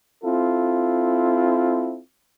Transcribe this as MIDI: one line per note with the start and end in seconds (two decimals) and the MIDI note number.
0.23 1.98 60
0.23 1.98 64
0.23 1.98 65
0.23 1.98 69